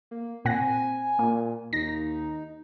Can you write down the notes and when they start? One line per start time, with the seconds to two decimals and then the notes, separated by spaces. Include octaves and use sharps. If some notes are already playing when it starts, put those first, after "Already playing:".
0.11 A#3
0.45 A#2 C4 F#5 G#5 A#6
1.19 A#2 A#3
1.73 D#2 D#4 A#6